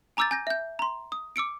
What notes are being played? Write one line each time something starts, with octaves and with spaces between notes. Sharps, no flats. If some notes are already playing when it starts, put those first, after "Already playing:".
G#5 A#5 D6 E6 G6 A6
G#5 G6 A#6
E5 G6
A#5 C6
D#6
D6 E6 C#7 D7